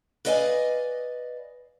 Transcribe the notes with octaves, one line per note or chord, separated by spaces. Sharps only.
B4 D5 D#5 F5 F#5 G#5